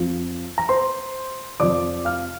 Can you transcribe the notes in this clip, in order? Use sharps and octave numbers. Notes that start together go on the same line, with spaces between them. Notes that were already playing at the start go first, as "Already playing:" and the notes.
Already playing: F2 F3
A#5
C5 C6
F2 C3 F3 D5 D6
F5 F6